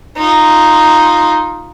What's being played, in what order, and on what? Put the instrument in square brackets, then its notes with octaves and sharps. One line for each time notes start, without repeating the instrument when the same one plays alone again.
[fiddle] D#4 F4